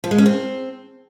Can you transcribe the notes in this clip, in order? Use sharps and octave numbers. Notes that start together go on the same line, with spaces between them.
F3
G#3
C#4
C4